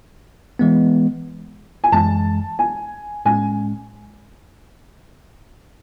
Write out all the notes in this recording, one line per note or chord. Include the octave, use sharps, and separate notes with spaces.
E3 G#3 B3
G#5
F#2 E3 G#3 A5
G#5
A2 G#3 C#4 G#5